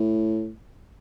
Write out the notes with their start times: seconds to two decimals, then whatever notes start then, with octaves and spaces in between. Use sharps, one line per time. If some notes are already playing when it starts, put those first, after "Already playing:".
Already playing: A2